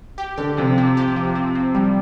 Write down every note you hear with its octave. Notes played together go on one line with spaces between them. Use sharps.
G4
D3 G4
C3 F3
C4
G4
F3
C4
C4
G3